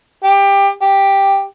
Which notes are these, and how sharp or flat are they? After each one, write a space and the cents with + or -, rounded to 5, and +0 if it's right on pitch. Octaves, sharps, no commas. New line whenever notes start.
G4 +20
G4 +5